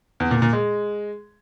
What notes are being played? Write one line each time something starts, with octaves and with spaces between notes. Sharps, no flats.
E2
A#2
A#2
G#3